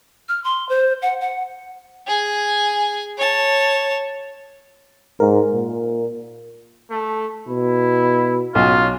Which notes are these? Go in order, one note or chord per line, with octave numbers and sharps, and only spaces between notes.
F6
C6
C5
F#5
F#5
G#4 G#5
C#5 A5
G#2 A#4
A#2
A3
B2 E4
B1 C#4 F4